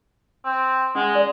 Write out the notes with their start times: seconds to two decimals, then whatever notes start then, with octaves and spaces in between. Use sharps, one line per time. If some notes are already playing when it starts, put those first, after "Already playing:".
0.45 C4
0.95 G#3 C#4 F#5 D#6
1.15 D5 D#6